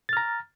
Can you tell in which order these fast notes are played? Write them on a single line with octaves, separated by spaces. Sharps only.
A6 F6 A#5